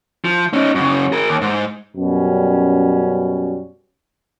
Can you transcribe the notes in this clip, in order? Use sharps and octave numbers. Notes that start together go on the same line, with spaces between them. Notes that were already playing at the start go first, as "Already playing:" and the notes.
F3
C#4 D#4
F#2 C#3
G#4 A#4
D#2
G#2
F#2 B2 G3 C#4